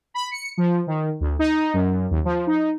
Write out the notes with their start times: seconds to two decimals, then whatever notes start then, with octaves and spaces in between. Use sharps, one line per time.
0.14 B5
0.31 C#7
0.57 F3
0.87 D#3
1.21 D2
1.39 D#4
1.74 F#2
2.11 D#2
2.25 F3
2.47 D#4